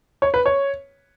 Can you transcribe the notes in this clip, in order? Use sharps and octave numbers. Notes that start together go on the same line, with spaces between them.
C#5
B4
C#5